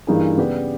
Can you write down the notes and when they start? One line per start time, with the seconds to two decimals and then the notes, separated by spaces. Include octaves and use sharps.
0.07 G2 E3 A#3 D#4 G#4
0.37 C#3 G3 B3 G4 B4